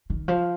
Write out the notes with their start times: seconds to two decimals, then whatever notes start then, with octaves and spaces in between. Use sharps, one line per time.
0.10 D#3
0.28 F3